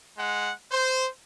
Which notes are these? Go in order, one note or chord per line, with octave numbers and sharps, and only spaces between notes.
G#3 F#5
C5